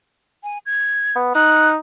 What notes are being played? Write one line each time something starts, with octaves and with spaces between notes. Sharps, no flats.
G#5
G#6
B3
D#4 F#6